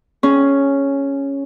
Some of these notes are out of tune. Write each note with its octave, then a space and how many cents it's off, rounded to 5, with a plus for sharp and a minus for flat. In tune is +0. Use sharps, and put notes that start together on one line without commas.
C#4 +0 G#4 +10